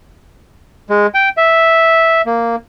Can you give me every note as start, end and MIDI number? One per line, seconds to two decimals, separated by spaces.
0.90 1.07 56
1.14 1.29 79
1.37 2.22 76
2.26 2.56 58